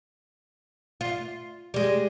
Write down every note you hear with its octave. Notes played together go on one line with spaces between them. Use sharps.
F4
G3 G#3